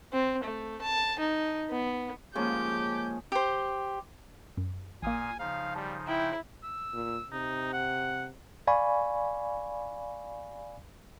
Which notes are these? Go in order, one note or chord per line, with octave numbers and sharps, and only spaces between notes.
C4
A3
A5
D#4
B3
G#2 F3 A#3 C#4 G4 G#4 G6
G4 C5
F#2
A1 A#2 A#3 F5 G#5 D#6
C#3 F3 D#4 F5
G3 A5
E4 G5
E6
A#2
C3 D#4
F#5
D5 F5 G#5 B5 C#6